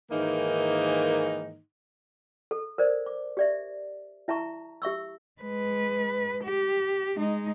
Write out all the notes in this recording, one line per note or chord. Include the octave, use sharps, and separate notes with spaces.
G#2 D#3 E3 A#3 D#4
A4
A#4 C5 D5
D6
G4 D5 E5
E4 E5 A5 A#5 C#6
G4 E5 C#6 E6
G#3 B4
G4
G#3 D#4